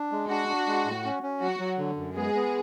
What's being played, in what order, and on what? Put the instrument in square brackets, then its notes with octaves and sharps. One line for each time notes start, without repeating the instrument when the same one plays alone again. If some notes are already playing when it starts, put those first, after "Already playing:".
Already playing: [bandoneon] D4
G#3
[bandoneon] D4 [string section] F#4
[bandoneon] D4
G#3
A2
C#4
C#4
[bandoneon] F#3 [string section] F#4
[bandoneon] F#3
D3
F#2
[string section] G#3 G#4 [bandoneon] B3
[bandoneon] B3